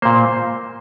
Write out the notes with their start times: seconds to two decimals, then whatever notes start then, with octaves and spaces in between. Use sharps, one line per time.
0.02 A#2 A#3 C5